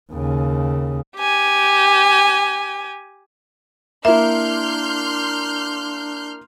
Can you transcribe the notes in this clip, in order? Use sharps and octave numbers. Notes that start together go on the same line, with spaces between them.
D#2 C#3
G4 G#5
A#3 D4 E4 E5 C6 F6 G6